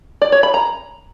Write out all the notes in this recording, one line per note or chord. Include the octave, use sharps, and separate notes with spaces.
D5
C#5
B5
A#5